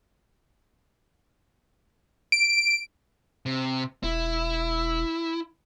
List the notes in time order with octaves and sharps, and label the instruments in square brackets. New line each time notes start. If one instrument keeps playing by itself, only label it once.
[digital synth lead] D7
[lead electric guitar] C3
[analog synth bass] E1 [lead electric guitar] E4